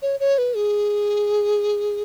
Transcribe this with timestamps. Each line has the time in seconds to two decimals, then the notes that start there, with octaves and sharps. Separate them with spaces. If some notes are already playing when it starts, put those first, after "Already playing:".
0.02 C#5
0.20 C#5
0.38 B4
0.56 G#4